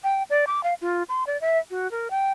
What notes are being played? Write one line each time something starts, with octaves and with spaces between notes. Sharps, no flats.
G5
D5
D6
F5
F4
C6
D5
E5
F#4
A#4
G5